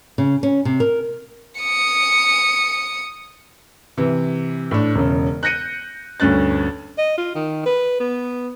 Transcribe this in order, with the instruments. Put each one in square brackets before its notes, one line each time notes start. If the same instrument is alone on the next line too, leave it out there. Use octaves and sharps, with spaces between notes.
[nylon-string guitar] C#3
C#4
C3
A#4
[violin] D#6 C#7
[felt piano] C3 E3
A2 D4
E1 C#3
F#6 G6 A#6 C#7 D#7
D2 G2 C#4 F#6 A6
[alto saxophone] D#5
F4
D#3
B4
B3